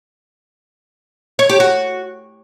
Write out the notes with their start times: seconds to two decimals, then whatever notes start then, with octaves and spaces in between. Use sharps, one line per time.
1.39 C#5
1.49 G4
1.60 F#4